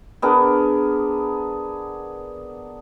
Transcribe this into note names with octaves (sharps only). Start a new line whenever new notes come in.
B3 D4 G#4 A#4